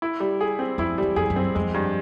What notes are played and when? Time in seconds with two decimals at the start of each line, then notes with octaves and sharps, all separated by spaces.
0.02 E4
0.20 G3
0.41 G#4
0.59 C4
0.78 F2 E4
0.98 E2 G3
1.16 F2 G#4
1.30 F#2
1.36 C4
1.55 F2 G#3
1.74 G2